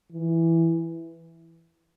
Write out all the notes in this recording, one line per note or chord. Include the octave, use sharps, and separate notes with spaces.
E3